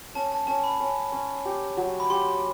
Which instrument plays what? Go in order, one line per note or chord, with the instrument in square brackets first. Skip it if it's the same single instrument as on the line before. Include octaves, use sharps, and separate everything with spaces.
[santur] C#4 [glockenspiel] A5
[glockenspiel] A5
[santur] C#4 [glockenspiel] A5
[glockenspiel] B5
[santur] C#4
C#4
G4
F#3
[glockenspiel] B5
[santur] G4 [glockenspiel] C6